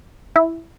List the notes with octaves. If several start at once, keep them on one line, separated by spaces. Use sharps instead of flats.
E4